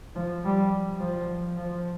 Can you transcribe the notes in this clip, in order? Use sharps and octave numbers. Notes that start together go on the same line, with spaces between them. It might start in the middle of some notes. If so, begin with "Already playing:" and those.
F3
G3
F3
F3